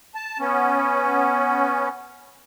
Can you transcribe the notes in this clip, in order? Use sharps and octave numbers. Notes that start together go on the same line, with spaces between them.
A5
B3 C#4